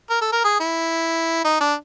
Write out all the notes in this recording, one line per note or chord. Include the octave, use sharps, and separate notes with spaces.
A#4
A4
A#4
G#4
E4
D#4
D4